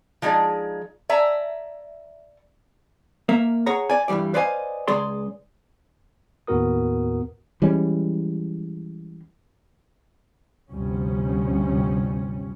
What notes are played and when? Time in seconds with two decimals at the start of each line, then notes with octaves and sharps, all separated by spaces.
0.22 F3 G#3 D#4 G#4 D5
1.09 D5 E5 G#5 A#5
3.29 A#3 A#4 E5
3.66 G#4 C#5 F#5 A#5
3.90 D5 G#5
4.08 G2 E3 F#3 G3 D5
4.34 B4 C5 D5 D#5 F5 G#5
4.88 C#2 G#3 G#4 D5 C6
6.47 D#2 A2 B3 F#4 A#4 D#6
7.62 E3 G3 G#3 C#4
10.70 G1 D2 C3 F3 G3 C#4